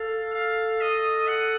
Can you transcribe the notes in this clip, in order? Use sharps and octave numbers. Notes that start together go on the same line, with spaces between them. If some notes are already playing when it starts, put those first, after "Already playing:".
Already playing: A4 F5
F5
D#5
F#5